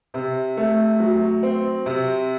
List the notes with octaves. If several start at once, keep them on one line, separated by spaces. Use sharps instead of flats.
C3
A3
F#3
C4
C3